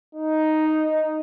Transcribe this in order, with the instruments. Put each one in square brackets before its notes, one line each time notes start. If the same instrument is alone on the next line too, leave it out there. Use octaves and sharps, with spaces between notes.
[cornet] D#4